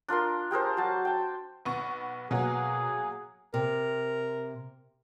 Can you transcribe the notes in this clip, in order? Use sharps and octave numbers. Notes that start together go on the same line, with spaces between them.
D4 F4 A#4 C6
G4 G#4 A#4 C5
F#3 A5
G5 A5
B1 B3 C#6
B2 F#3 A#3 F#4 G#4
C3 A#4